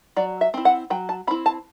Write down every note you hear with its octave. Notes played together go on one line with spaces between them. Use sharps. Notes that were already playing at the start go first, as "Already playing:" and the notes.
F#3 D5
E5
C4 E4
F#5
F#3 G5
A5
C4 E4 B5
A5